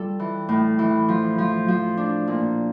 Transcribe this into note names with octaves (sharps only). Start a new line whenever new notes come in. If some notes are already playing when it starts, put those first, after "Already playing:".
Already playing: G3 F4 A4
E3
A2
E3
F3
F3
F3
D4
A#2